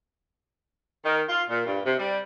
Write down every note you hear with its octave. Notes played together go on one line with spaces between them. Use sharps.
D#3
F4
A#2
G2
C3
G3